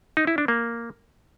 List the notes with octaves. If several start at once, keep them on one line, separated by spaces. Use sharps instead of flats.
D#4
E4
D4
A#3